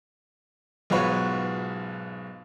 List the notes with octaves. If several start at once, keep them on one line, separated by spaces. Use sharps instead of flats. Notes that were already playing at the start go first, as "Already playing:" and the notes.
B1 G#2 F4 F#4 B4 C#5